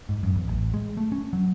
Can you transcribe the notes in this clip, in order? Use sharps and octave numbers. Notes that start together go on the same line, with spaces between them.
G#2
F#2
E2
A1
G#3
A3
C#4
F#3